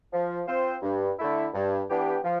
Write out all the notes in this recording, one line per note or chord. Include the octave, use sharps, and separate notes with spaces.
F3
C4 F4 C5
G2
D3 A3 E4
G2
E3 B3 D4 G4
F3